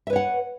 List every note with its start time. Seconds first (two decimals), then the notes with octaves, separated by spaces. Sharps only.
0.07 E5
0.10 B4
0.13 C#5
0.16 F#5